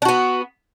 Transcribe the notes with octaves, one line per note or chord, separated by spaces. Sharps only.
B3 D4 F#4